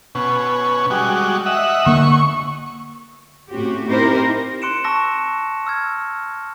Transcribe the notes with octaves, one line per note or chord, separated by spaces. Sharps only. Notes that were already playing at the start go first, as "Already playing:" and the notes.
B2 C#4
G3 G#3 F#4
D#5 E5 F#5
D3 A#3 C#6
A2 C4 C#4 F#4 G4
C4 D#4 E4 G4 A#4 C5
C6 F#6 C#7 D7 E7
A5 C#6 E6 A#6
E6 F6 G#6